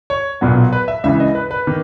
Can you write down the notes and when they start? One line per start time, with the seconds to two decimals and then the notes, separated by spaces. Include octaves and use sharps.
0.10 C#5
0.41 B1 A#2 F#3 B3
0.72 B4
0.88 E5
1.04 C#2 C#3 E3 E5
1.20 D#5
1.35 B4
1.51 B4
1.67 D#3 A#3